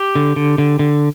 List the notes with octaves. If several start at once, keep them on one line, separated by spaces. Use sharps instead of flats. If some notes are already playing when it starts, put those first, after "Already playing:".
Already playing: G4
D3
D3
D3
D3